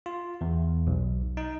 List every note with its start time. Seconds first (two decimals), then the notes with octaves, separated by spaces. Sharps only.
0.06 F4
0.41 E2
0.87 B1
1.37 D#4